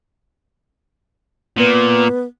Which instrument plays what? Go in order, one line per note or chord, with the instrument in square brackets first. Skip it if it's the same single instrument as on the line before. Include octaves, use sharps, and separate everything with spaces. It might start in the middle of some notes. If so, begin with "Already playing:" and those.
[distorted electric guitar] A#2 [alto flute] B3